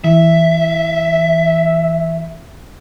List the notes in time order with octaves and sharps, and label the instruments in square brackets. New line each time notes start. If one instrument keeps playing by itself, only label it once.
[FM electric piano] E3 [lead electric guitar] E5